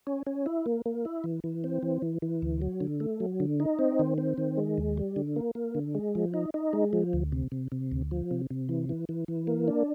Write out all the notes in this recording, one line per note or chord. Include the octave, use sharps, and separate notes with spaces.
C#4
C#4
E4
A#3
A#3
E4
E3
E3
C4
E3
E3
E3
D2
F#3
D3
A3
F#3
D3
D#4
C4
D#3
C4
D#3
G#3
D#2
G3
D3
A#3
A#3
D3
G#3
F3
D#4
D#4
G#3
F3
D2
C3
C3
C3
D2
F3
C3
C3
E3
E3
E3
E3
A#3
D4